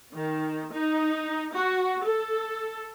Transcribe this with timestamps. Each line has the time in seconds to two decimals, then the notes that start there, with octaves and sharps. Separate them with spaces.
0.12 D#3
0.72 D#4
1.54 F#4
2.04 A4